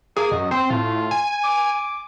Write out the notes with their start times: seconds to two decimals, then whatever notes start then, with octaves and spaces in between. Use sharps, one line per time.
0.17 A#3 G#4
0.31 F#2 D#5
0.51 C4 C5
0.70 A2 F4
1.11 G#5
1.44 D6